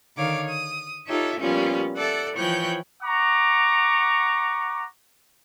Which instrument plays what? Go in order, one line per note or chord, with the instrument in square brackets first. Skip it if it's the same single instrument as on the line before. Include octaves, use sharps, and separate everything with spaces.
[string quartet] D3 D#3 C#5 F5 D6
D#6
D#4 F4 G4 A4 C#5 E5
A#2 F3 G3 B3 C#4 F4
A4 D5 E5 F#5
E3 F3 C#5 G5 F#6 G6
[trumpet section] F#5 A#5 C#6 D6